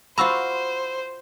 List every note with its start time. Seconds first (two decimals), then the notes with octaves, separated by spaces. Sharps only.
0.18 F4 F#4 C5 A#5 B5 E6